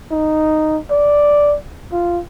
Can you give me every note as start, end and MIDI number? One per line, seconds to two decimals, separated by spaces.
0.11 0.79 63
0.91 1.56 74
1.92 2.20 65